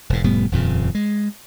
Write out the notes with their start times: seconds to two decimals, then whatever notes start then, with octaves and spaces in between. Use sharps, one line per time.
0.10 E1 G#2
0.24 F1 A2 G3 B3
0.52 D#1 F2 A#2 C#3
0.95 G#3